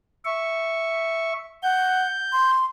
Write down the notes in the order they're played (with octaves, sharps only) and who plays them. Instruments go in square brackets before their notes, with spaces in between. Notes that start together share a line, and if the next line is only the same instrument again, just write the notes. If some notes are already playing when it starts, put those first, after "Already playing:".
[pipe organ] E5 C#6
[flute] F#5 [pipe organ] G6
[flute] C6